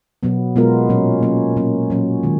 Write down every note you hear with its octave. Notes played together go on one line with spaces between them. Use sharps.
B2 F#3 B3
B2 G#3 B3 F4 A#4
A#2 F#3 C#4
F#3 A#3 C#4
A#2 F#3 A#3 C#4
A#2 F#3 C#4
D#3 G#3